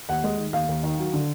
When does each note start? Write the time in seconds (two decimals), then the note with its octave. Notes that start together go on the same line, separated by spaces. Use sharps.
0.09 D#2 F#5
0.24 G#3
0.38 D#3
0.53 D#2 F5
0.69 D#2
0.83 D#3
0.99 F#3
1.13 D3